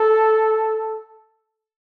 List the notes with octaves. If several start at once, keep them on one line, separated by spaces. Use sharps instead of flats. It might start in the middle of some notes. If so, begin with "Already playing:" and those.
Already playing: A4